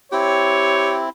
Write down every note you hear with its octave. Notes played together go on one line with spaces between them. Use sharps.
C4 E4 G4 C#5